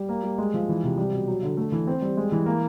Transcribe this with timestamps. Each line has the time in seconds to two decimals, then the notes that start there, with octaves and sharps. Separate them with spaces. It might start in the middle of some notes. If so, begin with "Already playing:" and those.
Already playing: G3
0.09 A#3
0.23 G3
0.38 G#3
0.54 F3
0.69 E3
0.84 C3
0.97 G3
1.12 B2
1.27 F#3
1.43 D3
1.57 A3
1.72 E3
1.87 C4
2.02 G3
2.17 G#3
2.32 E3
2.46 A#3